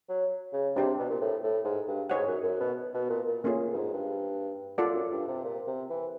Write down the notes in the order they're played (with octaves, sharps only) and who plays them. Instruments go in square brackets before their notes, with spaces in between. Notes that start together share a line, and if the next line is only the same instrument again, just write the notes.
[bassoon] F#3
C#3
[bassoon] C3 [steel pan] D4 G4 C5
[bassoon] B2
A#2
A2
A2
G#2
G2
[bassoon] G#2 [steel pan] D#4 G#4 C#5 F#5
[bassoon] F#2
F#2
B2
B2
A#2
A#2
[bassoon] A2 [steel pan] A#3 C#4 F4 G#4
[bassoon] G2
G#2
G2
[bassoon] F#2 [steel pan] F4 A4 D5 F#5
[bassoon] F#2
G2
C3
A#2
C3
E3